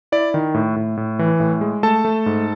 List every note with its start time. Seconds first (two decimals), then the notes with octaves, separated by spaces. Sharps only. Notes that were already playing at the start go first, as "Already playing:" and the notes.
0.12 E4 D5
0.34 D#3
0.54 A2
0.76 A2
0.97 A2
1.19 E3
1.40 A2
1.61 G#3
1.83 A3 A4 A5
2.05 A3
2.26 G#2